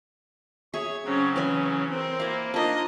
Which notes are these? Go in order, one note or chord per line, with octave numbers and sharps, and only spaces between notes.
G#4 C#5 E5 G#6
C#3 F#3 C4 C#4
E3 C#4 C#5 G#5
C4 A#4
A#3 E4 D5 F5
A#3 D4 D#4 F4 D#5